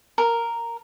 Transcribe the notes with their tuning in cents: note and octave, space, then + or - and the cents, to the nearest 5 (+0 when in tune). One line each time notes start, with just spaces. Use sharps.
A#4 -5